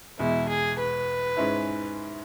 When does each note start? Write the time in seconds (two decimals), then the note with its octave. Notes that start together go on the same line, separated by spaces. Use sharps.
0.19 E2 B2 G#3 E4
0.49 G#4
0.79 B4
1.37 G#2 G#3 C#4 E4